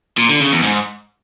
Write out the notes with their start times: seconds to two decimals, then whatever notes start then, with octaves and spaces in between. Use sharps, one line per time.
0.18 A#2
0.29 D3
0.41 C#3
0.52 E2
0.63 G#2